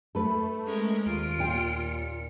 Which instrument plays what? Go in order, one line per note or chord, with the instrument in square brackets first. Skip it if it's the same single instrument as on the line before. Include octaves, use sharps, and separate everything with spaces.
[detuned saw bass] A3 [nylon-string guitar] A4 B4
[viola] G#3 [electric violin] C#4 A#4
[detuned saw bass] D#2 [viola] F4 [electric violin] D7
[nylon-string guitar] A#2 G5
[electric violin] C#7